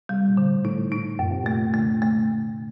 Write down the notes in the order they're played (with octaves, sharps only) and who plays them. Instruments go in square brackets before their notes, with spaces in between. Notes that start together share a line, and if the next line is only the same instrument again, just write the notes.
[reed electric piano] C3 [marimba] G3
[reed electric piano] A#2
[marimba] D3
[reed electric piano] A2
[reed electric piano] A2 [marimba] D#4
[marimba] D#4
[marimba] F#2 [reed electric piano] A#2
[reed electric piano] C3
[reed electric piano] A#2 [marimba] A3
[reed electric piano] D3 [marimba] A3
[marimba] A3